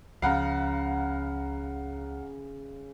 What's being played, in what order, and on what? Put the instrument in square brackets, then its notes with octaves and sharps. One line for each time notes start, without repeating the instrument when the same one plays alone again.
[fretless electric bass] C#2 F3 [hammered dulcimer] C#3 B5 [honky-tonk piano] F5 F#5 A#5